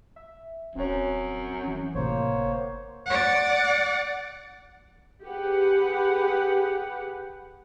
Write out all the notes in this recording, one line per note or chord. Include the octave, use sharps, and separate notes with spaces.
E5
D#1 F#2 C4 C#5
E3
G1 A2 C3 A#3 C5 C#5
F#5
D5 F#5
G4 G#4 B4 F#5